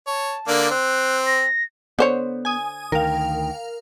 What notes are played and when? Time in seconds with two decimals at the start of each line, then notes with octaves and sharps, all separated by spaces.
0.07 C#5 A5
0.48 D3 A#3 D5
0.71 C4 F#6
1.27 A#6
1.99 D3 B3 C5 C#5
2.45 G#5 D#6
2.92 D2 D#3 A#4 F5 G5